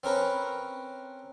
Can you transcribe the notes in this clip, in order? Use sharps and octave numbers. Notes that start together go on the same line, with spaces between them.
C4 C#4 A#4 B4